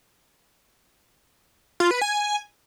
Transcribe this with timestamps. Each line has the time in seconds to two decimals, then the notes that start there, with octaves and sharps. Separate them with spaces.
1.80 F4
1.91 B4
2.01 G#5